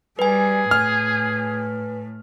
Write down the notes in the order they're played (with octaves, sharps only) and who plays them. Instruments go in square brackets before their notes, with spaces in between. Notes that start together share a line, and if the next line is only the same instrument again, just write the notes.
[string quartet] G3 [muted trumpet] G#4 [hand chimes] B4 G#5
[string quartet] A2 [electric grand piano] F6